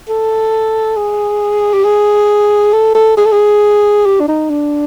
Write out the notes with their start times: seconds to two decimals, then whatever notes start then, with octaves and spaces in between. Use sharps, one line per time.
0.09 A4
0.96 G#4
1.74 G4
1.85 G#4
2.73 A4
2.95 A4
3.17 G#4
3.25 A4
3.32 G#4
4.06 G4
4.20 D4
4.28 D#4
4.50 D4